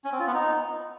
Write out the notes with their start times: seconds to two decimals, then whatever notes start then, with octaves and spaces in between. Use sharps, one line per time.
0.05 C#4
0.12 C4
0.19 F4
0.27 B3
0.34 D#4